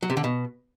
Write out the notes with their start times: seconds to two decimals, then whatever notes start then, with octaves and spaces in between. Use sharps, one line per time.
0.03 F#3
0.10 C3
0.17 D3
0.24 B2